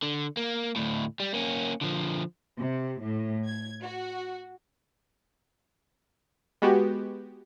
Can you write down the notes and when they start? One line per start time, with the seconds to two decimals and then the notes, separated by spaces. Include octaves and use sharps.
0.02 D3
0.37 A#3
0.76 D2 A2
1.20 G3
1.34 A#3 C#4
1.81 D3 F3
2.57 C3
3.01 A2
3.45 G#6
3.81 F#4
6.62 G#3 B3 F#4 G4